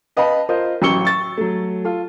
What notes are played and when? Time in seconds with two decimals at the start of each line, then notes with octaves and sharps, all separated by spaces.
0.17 B4 D#5 F5 G5 A5 B5
0.49 F4 A#4 C5 D#5
0.82 A1 F#3 C#6 E6 C#7 G7
1.05 C#6 A6
1.38 F#3 A3
1.85 F4 A4